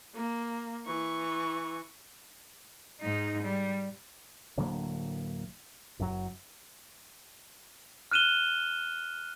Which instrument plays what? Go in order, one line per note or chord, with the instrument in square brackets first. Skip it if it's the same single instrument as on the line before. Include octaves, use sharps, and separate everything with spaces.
[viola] A#3
E3 C#6
[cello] G#2 D#4
G3
[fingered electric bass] D1 D3 F#3 A#3
F#1 F#2 C3 F#3
[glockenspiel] F6 F#6 D#7 E7 G7